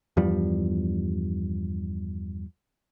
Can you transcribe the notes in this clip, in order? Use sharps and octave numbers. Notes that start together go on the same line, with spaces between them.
E2 G2 F3 G3